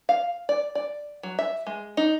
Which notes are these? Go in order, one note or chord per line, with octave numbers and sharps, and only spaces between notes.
F5
D5
D5
F#3
E5
G#3
D#4